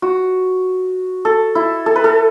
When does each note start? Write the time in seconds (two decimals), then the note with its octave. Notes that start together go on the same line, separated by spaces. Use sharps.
0.02 F#4
1.25 A4
1.55 E4
1.86 A4
1.96 B4
2.04 A4